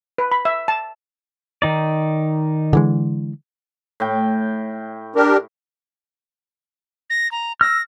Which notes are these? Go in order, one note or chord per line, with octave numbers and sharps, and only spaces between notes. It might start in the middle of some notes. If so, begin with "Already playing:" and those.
B4
B5
E5
A5
D#3 D#4 D5
D3 E3 G#3
A2 G5
D4 G4 A#4
A#6
A#5
E6 F6 A#6